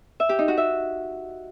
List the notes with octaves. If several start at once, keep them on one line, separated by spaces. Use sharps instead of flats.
E5
G4
D#4
F#4
E5